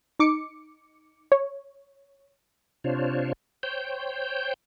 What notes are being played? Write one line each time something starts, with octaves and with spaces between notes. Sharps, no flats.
D#4 D6 C#7
C#5
C3 D4 F4 C5 C#5
C5 C#5 G5 G6